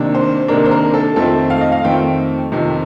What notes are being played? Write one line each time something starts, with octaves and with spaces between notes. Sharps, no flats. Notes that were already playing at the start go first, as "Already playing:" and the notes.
Already playing: C3 D#3 A#3 D4
C5
C3 D#3 A#3 D4 A#4
C5
A#4
A4
F2 D#3 A3 C4 A4
F5
D#5
F5
F2 D#3 A3 C4 G5
F2 C3 D#3